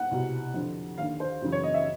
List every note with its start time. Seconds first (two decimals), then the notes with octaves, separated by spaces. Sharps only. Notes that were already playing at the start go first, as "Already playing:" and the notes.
Already playing: F#5
0.11 C2 B2
0.54 F2 D3
0.98 D#2 D3 F5
1.20 C5
1.42 F#2 C#3 E3
1.52 C#5
1.64 D#5
1.74 E5